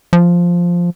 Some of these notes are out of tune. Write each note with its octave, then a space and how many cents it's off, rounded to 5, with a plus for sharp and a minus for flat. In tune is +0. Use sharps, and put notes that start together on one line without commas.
F3 +0